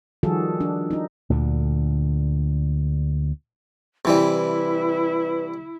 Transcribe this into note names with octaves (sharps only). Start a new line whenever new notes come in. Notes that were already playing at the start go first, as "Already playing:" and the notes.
D#3 F3 G3 F#4 G#4 A4
D4
D4 D#4
D2 A#2 D3
C3 E3 G3 E4 B4